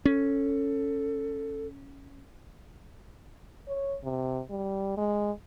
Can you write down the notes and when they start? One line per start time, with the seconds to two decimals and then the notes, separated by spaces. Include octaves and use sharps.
0.05 C#4 A4
3.68 C#5
4.03 C3
4.50 G3
4.97 G#3